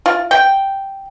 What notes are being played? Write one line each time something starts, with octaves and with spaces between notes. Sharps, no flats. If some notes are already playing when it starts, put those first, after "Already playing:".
F4
G5